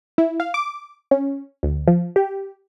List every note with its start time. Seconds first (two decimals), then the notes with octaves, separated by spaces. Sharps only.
0.18 E4
0.40 F5
0.54 D6
1.11 C#4
1.63 D2
1.88 F3
2.16 G4